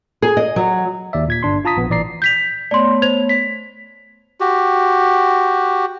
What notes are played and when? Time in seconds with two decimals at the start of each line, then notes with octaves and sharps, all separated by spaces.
0.22 G#4
0.37 D#5
0.56 F#3
1.13 D#2 D5 E5
1.28 A#2 G#6 B6
1.43 G1 D4 C6
1.65 F4 A5 A#5 D#6 B6
1.77 A#1 B3
1.89 A1 A#2 E3 D5 A#5 C7
2.22 G6 B6 F7
2.71 A3 B3 C#5 D5 C6
3.02 C5 G#6 F7
3.29 B6
4.40 F#4 G4